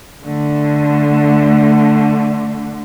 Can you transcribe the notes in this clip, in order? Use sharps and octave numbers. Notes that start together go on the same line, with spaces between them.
D3 A3